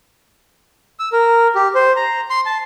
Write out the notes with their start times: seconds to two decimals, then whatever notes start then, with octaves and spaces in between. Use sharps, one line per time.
0.99 E6
1.12 A#4
1.55 G4
1.75 C5
1.96 A#5
2.30 C6
2.46 A5